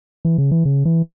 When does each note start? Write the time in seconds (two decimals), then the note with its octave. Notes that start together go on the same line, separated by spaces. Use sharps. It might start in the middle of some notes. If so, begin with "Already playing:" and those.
0.25 E3
0.38 C#3
0.51 E3
0.65 C#3
0.85 E3